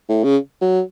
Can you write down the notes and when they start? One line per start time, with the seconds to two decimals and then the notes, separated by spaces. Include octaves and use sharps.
0.09 A2
0.24 C#3
0.61 F#3